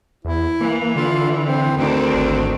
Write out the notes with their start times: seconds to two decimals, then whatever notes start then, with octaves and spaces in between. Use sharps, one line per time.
0.25 E2 E4
0.61 E3 A#3
0.96 D3 F4
1.46 C4
1.77 D2 D#3 C4 D4
2.14 G#1